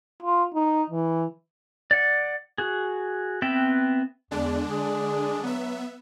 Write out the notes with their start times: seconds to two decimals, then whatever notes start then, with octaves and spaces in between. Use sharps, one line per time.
0.23 F4
0.55 D#4
0.90 E3
1.91 D5 F#5
2.58 F#4 G#4
3.42 B3 C4 B4 E5 G5
4.31 E2 D3 G#3 D4
4.70 G#4
5.43 F#3 B3 E5